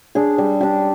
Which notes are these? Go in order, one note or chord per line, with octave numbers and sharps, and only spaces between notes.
D4 G#4
G3
D4 G4